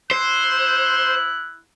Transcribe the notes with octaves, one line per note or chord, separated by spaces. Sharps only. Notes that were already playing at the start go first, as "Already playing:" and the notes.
E4 C5 F#6